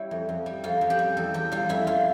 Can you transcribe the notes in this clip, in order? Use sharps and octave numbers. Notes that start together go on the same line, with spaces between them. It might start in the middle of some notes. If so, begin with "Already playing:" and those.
Already playing: G3 E4 C#5
F2
F2
G3
F2 F4
F2
G4
G3
E2 A4
E2 G4
G3 F4
F2 E4
F2 F4